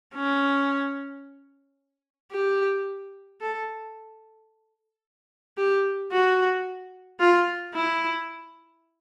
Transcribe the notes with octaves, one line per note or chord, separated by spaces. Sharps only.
C#4
G4
A4
G4
F#4
F4
E4